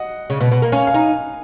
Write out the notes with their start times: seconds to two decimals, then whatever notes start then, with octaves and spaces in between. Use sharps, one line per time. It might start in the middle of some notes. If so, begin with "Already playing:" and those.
Already playing: D#5 F#5
0.30 C#3
0.41 B2
0.51 B2
0.62 A#3
0.72 C#4 F5 G#5
0.87 F5 G#5
0.94 D#4